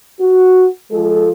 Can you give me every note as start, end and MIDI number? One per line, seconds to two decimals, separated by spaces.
0.20 0.68 66
0.92 1.30 53
0.92 1.30 56
0.92 1.30 65
0.92 1.30 69